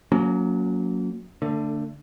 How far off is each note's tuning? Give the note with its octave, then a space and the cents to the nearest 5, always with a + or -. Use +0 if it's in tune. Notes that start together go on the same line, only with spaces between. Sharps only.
F#3 -20 A#3 -15 C#4 +30
D3 +5 A3 +35